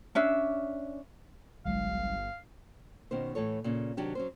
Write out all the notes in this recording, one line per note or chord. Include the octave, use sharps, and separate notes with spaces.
C#4 D4 E5
G1 C2 F#3 G#3 F5
B2 D#3 C#4 C5
A2 E3 A4 C#5
A#2 C#3
C3 D#3 F#3 D4 G4
F#3 C#4 C5